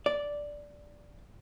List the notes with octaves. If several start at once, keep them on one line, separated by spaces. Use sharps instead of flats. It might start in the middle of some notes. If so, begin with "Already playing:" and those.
D5